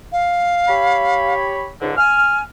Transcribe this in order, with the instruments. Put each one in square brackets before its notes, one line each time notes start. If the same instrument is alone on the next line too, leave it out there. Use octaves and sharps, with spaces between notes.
[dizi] F5
[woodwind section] G4 C#5 B5
C#2 G#2 D3
[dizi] G#5 [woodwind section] F6